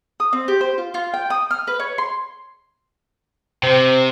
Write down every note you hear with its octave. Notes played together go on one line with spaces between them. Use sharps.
D#6
C4
G4
C5
F4
F4
G5
D#6
F6
B4
C#5
C6
C3 C4